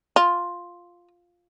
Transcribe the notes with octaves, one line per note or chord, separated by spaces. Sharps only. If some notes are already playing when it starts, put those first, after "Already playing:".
F4